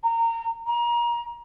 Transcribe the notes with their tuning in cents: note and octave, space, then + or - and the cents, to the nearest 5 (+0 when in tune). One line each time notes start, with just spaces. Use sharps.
A#5 -25
A#5 +30